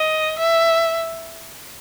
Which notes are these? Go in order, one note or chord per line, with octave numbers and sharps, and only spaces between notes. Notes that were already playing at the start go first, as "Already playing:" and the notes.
Already playing: D#5
E5